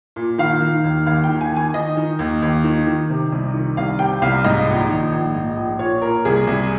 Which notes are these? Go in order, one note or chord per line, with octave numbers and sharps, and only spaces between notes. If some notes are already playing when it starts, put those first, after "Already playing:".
A#2
D#3 F5
D#3
D#2
D#2 F5
G5
D#3
G#5
D#3 G#5
D#3 D#5
D#3
D#2
D#2
D#3
D#3
C3
C2
D#3
C2 F5
C3 G5
C2 F5
G#2 D#5
A#1
D#3
A#1
G#2
A#1
A#2 C#5
A#2 A#4
C2 G#4
C2